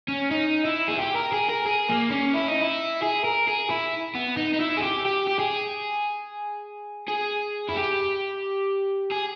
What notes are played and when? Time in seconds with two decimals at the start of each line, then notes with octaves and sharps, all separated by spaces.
0.08 C#4
0.31 D#4
0.65 E4
0.88 G#4
0.99 G4
1.16 A#4
1.33 G#4
1.50 A#4
1.67 G#4
1.90 A#3
2.12 C#4
2.34 E4
2.48 D#4
2.61 E4
3.02 G#4
3.24 A#4
3.47 G#4
3.70 E4
4.15 B3
4.37 D#4
4.54 D#4
4.61 E4
4.78 G#4
4.83 G4
5.06 G4
5.27 G4
5.39 G#4
7.08 G#4
7.69 E4
7.76 G4
9.11 G#4